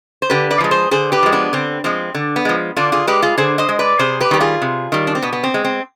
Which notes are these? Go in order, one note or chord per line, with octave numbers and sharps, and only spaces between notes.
C5
D3 G4 B4
B4 D5
F3 G#3
G#4 C5
D3 G#4 C5
G4 B4
F3 G#3
B3 D4
D3 C4
F3 G#3 C4
D3
B3
F3 G#3
D3 D4 F4
F4 G#4
G#3 G4 B4
F4 G#4
D3 G#4 C5
C5 D#5
G#3
B4 D5
C3 G#4 C5
G4 B4
D#3 G3 G4
F4 G#4
C3
D#3 G3
D4
C4
B2 B3
B3
C4
G#3
C4